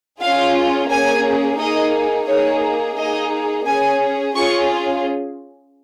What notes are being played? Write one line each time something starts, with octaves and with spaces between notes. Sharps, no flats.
C#4 F4 G#4 F5
A#3 C#4 G#4 G#5
A#3 D#4 G#4 D#5
A#3 D#4 G#4 C#5
A#3 D#4 G#4 D#5
C#4 G#4 G#5
C#4 F4 G#4 C#6